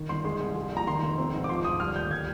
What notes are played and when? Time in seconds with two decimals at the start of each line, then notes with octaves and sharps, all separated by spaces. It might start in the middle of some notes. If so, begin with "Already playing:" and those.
Already playing: D#3
0.09 G1 C6
0.25 G#3 C6
0.41 C2
0.55 G#3
0.71 A#1
0.77 A#5
0.87 D#3 C6
1.02 F1
1.18 C4
1.34 G#2
1.44 D6
1.49 F3 C6
1.64 D2 D#6
1.80 G3 F6
1.96 D#2 G6
2.11 G3 G#6